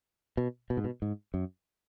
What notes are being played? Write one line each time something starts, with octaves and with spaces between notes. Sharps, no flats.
B2
B2
G#2
B2
G#2
F#2